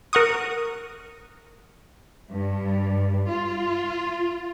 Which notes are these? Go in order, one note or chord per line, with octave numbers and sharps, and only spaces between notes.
A#4 F#5 C#6 D#6
G2
F4